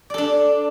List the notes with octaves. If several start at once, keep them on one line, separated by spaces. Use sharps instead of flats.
D4 A4 D5